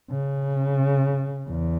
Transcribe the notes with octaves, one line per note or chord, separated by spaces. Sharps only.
C#3
E2